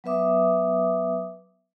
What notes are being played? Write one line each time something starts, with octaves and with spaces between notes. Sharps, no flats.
F#3 B3 B4 E5 D6 D#6